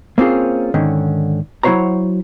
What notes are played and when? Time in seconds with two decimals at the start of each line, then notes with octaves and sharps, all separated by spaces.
0.18 A#3 C4 C#4 F4 G#4
0.74 G#2 D3 D#3 C#4
1.63 F#3 E4 F#4 C5 C#5 A#5